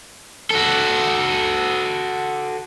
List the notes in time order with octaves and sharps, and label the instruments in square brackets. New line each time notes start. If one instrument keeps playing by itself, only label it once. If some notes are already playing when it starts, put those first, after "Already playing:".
[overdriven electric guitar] F#4 A4